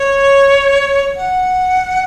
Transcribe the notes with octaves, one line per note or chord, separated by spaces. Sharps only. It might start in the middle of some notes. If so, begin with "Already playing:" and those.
Already playing: C#5
F#5